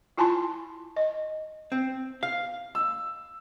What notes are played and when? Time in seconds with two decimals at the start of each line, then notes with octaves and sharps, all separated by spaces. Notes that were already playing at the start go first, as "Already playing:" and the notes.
0.18 E4 F4 G#5 A5 B5 C6
0.96 D#5
1.72 C4
2.23 F5
2.75 E6